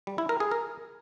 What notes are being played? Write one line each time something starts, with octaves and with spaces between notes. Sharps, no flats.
G3
E4
A#4
G#4
A#4